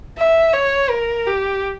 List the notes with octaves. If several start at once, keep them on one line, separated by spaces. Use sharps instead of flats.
E5
C#5
A#4
G4